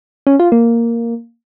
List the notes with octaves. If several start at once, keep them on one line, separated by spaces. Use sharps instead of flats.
C#4
F4
A#3